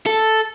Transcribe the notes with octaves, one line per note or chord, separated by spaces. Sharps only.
A4